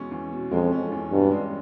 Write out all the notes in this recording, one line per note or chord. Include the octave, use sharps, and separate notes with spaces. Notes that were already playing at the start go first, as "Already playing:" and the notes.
Already playing: E2 B2 G#3 C#4
E2
B2
F2 G#3
C#4
E2
G2 B2
G#3